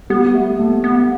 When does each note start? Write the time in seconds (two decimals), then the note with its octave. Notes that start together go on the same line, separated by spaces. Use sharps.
0.10 G3 B3
0.35 A3
0.59 A3 B3
0.84 B3